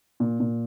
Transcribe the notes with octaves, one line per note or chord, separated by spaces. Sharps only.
A#2
A#2